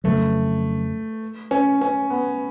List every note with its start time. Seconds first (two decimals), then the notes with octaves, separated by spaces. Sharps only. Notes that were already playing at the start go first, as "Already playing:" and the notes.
0.04 F2 C#3 F#3 A3
1.51 C#4
1.81 C#4
2.10 B3